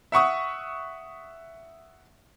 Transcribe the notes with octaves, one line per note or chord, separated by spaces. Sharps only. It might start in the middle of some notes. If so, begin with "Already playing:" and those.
E5 F#5 C#6 D#6